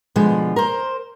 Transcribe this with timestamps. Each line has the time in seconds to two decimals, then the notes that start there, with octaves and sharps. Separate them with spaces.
0.16 B2 D3 F3 G#3
0.56 A#4 C5